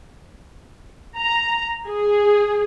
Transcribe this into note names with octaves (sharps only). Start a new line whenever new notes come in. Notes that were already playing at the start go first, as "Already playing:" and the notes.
A#5
G#4